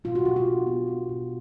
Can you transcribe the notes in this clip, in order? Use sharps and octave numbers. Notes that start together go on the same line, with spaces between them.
B2 F4
F#4
B2 G4
F4
D4
B3
B3
B2